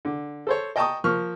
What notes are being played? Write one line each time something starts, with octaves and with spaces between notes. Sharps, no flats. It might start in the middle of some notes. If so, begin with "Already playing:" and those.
D3
A4 C5 C#5
D#5 G5 A5 A#5 C#6 D#6
F3 A#3 C#6 F6